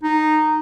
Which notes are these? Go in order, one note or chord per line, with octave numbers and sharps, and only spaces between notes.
D#4